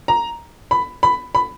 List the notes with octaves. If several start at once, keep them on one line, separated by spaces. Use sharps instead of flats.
A#5
B5
B5
B5